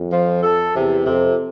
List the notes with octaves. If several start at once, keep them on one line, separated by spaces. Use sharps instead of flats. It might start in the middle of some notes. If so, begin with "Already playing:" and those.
Already playing: F2
F3
A4
E2 C3
F2 C3